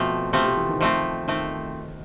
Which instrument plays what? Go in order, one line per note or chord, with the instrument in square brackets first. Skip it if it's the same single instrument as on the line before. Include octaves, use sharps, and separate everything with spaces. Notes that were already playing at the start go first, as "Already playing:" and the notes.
Already playing: [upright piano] B2 [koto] F3 A3 C4
[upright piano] C3 [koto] F3 A3 C4
[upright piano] C3
E3
D#3
[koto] F3 A3 C4
[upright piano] D#3 [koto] F3 A3 C4